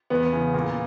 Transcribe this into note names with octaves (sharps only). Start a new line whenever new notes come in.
E2 B3
C#3 E3
A#2